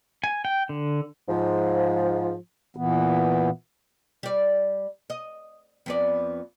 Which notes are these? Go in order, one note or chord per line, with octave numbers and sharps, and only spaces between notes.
G#5
G5
D3
G#2 F3
A#2 E3 B3
G3 D5
D#5
F2 B3 D5